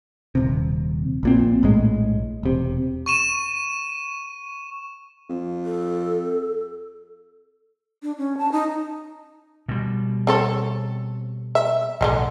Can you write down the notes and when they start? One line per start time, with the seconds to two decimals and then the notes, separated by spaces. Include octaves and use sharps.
0.35 D#1 C3
1.23 A#1 A#2 C4
1.63 A#1 A2 G#3
2.43 E1 C3
3.06 C#6 D#7 E7
5.29 F2
5.65 A4
8.03 D4
8.18 C#4
8.38 A5
8.52 D#4
9.68 B2 G3
10.27 C4 A4 C#5
11.55 E5
12.01 B1 A2 D3 G3 G#3